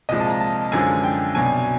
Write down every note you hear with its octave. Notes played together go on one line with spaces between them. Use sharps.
C2 A#2 F3 G#3 D#5
A5
A#5
A5
F#2 D3 F3 G#3 G#5
G5
C2 B2 F#3 G#5